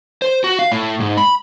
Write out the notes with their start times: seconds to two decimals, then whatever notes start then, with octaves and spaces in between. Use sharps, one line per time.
0.22 C5
0.44 F#4
0.59 F5
0.72 A2
1.00 G#2
1.17 B5